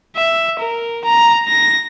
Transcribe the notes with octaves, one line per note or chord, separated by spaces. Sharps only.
E5
A#4
A#5
A#6